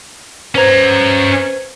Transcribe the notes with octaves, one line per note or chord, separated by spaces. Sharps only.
C#4 B4 C5 A#5 G#6